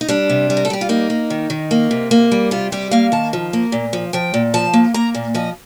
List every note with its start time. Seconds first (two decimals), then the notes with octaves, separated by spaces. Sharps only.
0.01 D#4
0.08 G3 D4
0.30 C3
0.50 G3
0.57 A#4
0.65 A4
0.70 G3 G4
0.81 F4
0.89 A#3 D#4
1.10 A#3
1.30 D#3
1.50 D#3
1.71 A#3
1.91 C3
2.11 A#3
2.32 G3
2.51 C3 F4
2.72 G3 G4
2.91 A#3 F5
3.12 D#3 A5
3.33 F3
3.53 A#3
3.72 A#2
3.93 F3
4.13 F3 G5
4.34 A#2
4.54 F3 A5
4.74 A#3
4.94 A#3 A#5
5.15 A#2
5.35 F3 D#5